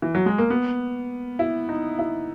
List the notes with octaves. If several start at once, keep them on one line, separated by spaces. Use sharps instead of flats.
E3
F#3
G#3
A#3
B3
E4
D#4
E4